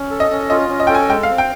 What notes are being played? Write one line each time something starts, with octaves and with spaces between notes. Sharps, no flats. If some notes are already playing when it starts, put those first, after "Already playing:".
Already playing: C#4
A4
D#5
C#4
F4 D#5
C#4
D#5
A4 G5
G#5
G#3 G5
F5
C4
G5